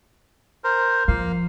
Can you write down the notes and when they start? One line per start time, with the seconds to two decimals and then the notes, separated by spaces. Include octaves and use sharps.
0.64 A#4 C5
1.08 F3 A#3 F5